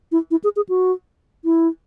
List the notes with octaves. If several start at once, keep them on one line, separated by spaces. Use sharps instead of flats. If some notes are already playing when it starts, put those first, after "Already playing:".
E4
E4
G#4
G#4
F#4
E4